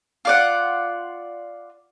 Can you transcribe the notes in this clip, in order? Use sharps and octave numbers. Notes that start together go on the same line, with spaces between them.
F4 D5 F#5